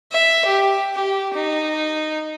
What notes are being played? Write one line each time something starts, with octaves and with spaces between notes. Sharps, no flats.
E5
G4
G4
D#4